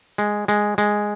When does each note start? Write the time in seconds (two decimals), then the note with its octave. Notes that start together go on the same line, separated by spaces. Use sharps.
0.18 G#3
0.48 G#3
0.78 G#3